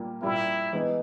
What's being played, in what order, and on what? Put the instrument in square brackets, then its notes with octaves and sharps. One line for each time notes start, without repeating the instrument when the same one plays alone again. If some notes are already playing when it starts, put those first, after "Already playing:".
Already playing: [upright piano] A#2 G3 A#3
[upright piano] A#2 G3 A#3 [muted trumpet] E4
[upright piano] E3 G#3 B3 D#4